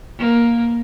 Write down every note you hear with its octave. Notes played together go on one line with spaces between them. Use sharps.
A#3